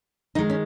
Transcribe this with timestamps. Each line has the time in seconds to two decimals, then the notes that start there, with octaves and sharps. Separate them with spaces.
0.35 D#3 G#3 D#4
0.50 C#4